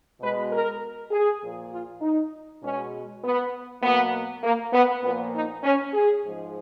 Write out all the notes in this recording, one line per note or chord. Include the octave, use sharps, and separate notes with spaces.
B2 G#3 B4
A#4
G#4
A#2 F3 A#3
F4
D#4
B2 G#3 C#4
B3
B2 F#3 A#3 B3
A#3
B3
A#2 F3 A#3 B3
D#4
C#4
G#4
G#2 F3 G#3